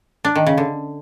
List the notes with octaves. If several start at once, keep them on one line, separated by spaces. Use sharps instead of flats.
D4
D#3
C#3
D3